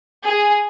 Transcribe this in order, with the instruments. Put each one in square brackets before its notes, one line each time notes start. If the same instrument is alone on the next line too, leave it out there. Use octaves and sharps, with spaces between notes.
[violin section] G#4